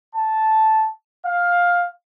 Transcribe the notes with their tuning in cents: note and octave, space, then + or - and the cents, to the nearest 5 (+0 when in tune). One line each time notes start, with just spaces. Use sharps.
A5 -5
F5 +10